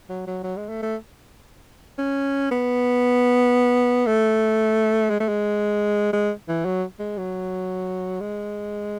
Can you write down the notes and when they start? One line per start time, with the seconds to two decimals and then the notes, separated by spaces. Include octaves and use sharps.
0.09 F#3
0.27 F#3
0.43 F#3
0.57 G#3
0.69 A3
0.82 A3
1.98 C#4
2.51 B3
4.07 A3
5.10 G#3
5.20 A3
5.29 G#3
6.13 G#3
6.48 E3
6.65 F#3
6.99 G#3
7.18 F#3
8.21 G#3